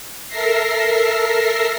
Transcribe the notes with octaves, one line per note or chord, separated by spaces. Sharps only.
A4 A#4 E5 A#6 C7